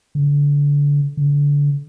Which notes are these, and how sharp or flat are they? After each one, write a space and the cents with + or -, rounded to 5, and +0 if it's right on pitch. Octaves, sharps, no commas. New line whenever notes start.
D3 -30
D3 -30